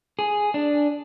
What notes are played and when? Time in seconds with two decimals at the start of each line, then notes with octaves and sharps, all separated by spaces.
0.19 G#4
0.54 D4